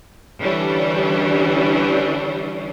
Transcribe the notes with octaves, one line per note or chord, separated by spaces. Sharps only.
D3 E3 G3 C#4 D4